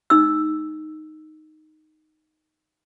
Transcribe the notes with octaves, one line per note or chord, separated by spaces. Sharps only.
D#4 E6